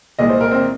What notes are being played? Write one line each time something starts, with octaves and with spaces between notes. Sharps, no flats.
C2 A#2 G#3 D#5
C5
A#4
C4